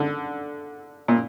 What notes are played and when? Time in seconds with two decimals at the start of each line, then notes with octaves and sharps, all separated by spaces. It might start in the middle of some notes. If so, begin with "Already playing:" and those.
Already playing: D3
1.08 A#2